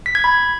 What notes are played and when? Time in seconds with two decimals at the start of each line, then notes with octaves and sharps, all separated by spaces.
0.06 B6
0.15 G#6
0.24 B5